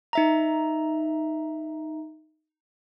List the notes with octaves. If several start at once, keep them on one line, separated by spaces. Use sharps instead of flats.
D#4 E5 A#5